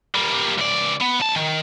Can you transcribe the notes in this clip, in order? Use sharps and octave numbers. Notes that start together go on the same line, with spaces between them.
G3 A#3
C#2 D5
B3
C2 A5
D#3